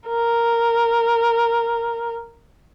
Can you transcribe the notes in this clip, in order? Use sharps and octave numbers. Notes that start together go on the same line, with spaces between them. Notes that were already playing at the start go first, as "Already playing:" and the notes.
A#4